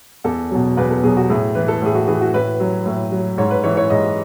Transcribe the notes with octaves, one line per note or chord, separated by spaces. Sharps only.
E2 A4
B2 F#3
E2 B4
A4
B2 F#3 G#4
F#4
A2 G#4
E3 B4
A4
A2 G#4
F#4
E3 G#4
F#4
A2 B4
F#3
A2
F#3
G#2 C#5
B4
E3 C#5
C#5
G#2 D#5